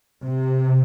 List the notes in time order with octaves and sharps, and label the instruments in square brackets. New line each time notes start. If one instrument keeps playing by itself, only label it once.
[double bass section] C3